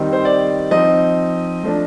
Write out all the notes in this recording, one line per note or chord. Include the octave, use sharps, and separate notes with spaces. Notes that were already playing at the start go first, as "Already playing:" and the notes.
Already playing: D#3 G3 C4 D#4
C5
D5
F3 C4 D#4 D#5
F3 A3 D4